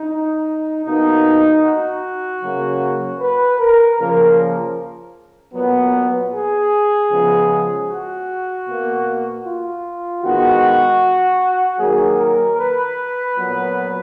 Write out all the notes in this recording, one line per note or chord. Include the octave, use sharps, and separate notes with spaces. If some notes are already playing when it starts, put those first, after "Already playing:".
Already playing: D#4
B2 A#3 D#4
F#4
C#3 F#3 A#3
B4
A#4
C#3 F3 A#3 A#4
A#2 F#3 B3
G#4
C#3 F3 G#3 B3
F#4
B2 A#3
F4
D#3 G#3 B3 F#4
D#3 F#3 A#3 G#4
A#4
B4
A#2 F#3 B3